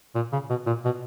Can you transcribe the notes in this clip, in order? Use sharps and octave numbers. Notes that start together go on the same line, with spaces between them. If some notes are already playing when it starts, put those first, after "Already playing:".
A#2
C#3
B2
A#2
B2